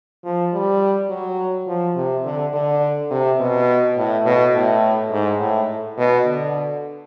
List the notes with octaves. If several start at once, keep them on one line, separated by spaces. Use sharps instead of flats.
F3
G3
F#3
F3
C3
D3
D3
C3
B2
A2
B2
A2
G#2
A2
B2
D3